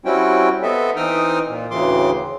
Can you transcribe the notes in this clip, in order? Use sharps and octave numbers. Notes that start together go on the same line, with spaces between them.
G3 C4 C#4 E4 F#4 G5
B3 C4 A4 D#5 E5
E3 C4 D#4 G5 D#6 F6
A#2
D2 A2 C#3 E3 C6 D6